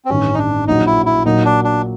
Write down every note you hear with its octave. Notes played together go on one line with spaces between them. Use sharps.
C4
A1 G2 D#3 C#4
D#4
D4
A#1 A#2 F#3 D#4
E4
E4
A#2 F#3 A#3 D#4
D4
D4